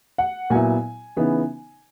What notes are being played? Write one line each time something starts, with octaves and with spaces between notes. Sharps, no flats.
F#5
A#2 F#3 B3 E4 G#5
C#3 E3 B3 D#4